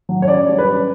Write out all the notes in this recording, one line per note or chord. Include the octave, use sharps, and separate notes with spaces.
F#3
C#5
C#4 D5
G3
B4
C#4